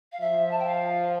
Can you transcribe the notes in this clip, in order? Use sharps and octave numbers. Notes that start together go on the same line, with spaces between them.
F5
F3 E5
A5
G5
F5